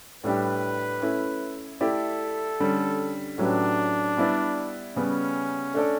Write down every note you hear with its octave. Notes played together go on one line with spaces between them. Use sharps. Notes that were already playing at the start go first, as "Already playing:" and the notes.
A2 G3 D4 G4 B4
A3 C#4 E4
A3 E4 G4 A4 D5
D3 G3 C#4
A2 F#3 C#4 D4 G4 B4
G3 B3 E4 B4 D5
C#3 G3 B3 C#4
A3 D4 A4 D5